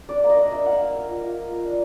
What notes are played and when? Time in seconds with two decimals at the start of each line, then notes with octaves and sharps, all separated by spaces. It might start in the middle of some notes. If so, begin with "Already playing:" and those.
0.09 D4 D5
0.24 A#3
0.30 D#5
0.38 D4
0.51 A#3 E5
0.66 A#3 F#5
0.73 F5
0.80 A#3
0.94 A#3 E5
1.08 F4 D#5
1.22 F4 F5
1.36 F4
1.51 A#3
1.65 D4